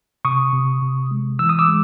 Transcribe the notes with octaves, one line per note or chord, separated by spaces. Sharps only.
C3 C#6 D#6
C3
C3
G#3
E3 E6
D#6
D6 E6
G#3